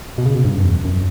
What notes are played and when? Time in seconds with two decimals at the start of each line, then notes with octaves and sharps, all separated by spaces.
0.18 B2
0.25 C#3
0.35 B2
0.45 G2
0.54 F#2
0.64 E2
0.85 F#2